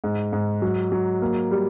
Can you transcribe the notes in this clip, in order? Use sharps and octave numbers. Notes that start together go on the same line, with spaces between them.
G#2
G#2
F#3
F#3
A#3
G3